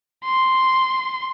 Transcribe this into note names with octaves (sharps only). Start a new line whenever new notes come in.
C6